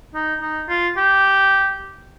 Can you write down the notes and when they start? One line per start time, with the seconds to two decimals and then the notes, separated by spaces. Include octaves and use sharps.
0.15 D#4
0.41 D#4
0.69 F4
0.97 G4